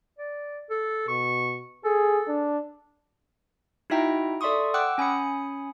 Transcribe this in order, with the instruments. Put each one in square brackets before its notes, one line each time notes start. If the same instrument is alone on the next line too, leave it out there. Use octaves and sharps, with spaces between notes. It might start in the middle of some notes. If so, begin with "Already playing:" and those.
[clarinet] D5
A4
[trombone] B2 [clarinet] C#6
[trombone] G#4 [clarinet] A4
[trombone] D4
[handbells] D#4 E4 F#4 E5 G5 A#5
A4 D5 E5 C6 C#6 D#6
F#5 G5 D6 E6 F#6
C#4 G#5 B5 D#6 C#7